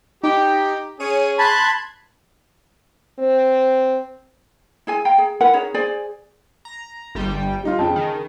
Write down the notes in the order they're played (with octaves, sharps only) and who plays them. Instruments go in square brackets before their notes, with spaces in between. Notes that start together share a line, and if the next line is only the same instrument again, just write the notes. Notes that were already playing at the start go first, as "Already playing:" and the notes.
[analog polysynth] D#4 [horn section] G4
[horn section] C#4 G#4 [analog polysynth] C#5 D#7
[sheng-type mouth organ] A5 B5 [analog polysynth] C6 F#6 G#6
[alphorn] C4
[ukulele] E4 G#4 G#5
F5 G5 A#5
G#4
E4 A#4 B4 F#5
C#4 D#4 G#4 C#5
G#4 C5 D5 G#5
[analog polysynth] A#5
G1 G3 G5
[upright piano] G3 D#4 F4
[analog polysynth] F2 [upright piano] C#3 G5 A5
[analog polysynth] D#3